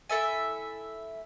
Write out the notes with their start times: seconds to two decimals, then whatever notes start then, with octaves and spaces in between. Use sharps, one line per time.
0.09 E4 A4 E5 G#5